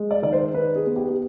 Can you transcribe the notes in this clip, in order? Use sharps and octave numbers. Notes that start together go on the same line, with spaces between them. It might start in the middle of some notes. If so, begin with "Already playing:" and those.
Already playing: G#3
D5
D#3 D5
C5
D#4 B4
G#4
B3
G4
G4